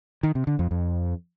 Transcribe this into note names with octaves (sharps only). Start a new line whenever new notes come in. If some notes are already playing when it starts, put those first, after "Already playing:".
D#3
C3
D3
F2
F2